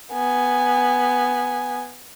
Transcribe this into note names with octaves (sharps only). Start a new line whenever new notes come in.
B3 G#5